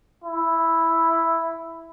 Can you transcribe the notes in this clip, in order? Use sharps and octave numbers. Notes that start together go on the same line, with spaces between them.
E4